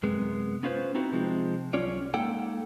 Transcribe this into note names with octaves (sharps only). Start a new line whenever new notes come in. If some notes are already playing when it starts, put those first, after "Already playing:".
F#2 C3 G#3 B3
B3 C#4 F4 B4 C5
B3 C4 D#4 E4 F#4
C3 F3 G#3 C4
C2 F#3 C#4 F4 C#5 D5
G#3 A#3 D#4 A4 F#5 G5